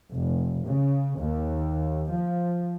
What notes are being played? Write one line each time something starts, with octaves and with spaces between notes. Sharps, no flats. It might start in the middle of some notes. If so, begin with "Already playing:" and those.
F1
C#3
D#2
F3